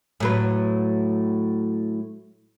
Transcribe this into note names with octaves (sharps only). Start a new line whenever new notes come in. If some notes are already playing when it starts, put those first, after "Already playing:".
A2 F#3 B4